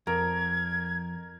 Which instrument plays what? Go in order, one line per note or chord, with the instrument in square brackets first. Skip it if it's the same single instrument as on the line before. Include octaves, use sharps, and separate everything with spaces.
[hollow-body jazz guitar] F2 [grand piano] A#4 [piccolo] G#6